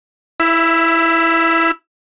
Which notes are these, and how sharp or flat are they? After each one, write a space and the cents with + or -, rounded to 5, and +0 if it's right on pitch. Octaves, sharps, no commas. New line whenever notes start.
E4 +0 E5 +25